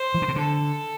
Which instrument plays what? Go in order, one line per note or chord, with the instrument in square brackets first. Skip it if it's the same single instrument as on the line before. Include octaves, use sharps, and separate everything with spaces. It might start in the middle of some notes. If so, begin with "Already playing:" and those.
Already playing: [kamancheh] C5
[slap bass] E3
D3
C3
[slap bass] D3 [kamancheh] A4